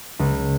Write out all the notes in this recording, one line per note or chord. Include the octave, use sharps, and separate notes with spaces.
C#2